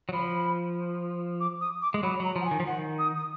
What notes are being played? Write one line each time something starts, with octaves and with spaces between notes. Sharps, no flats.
F#3
F3 B5
D6
D#6
D6
G#3
F#3 B5
F#3 A#5
F3
F#5
G#5
D#3
F3
D#3 F#5
D#6
D#6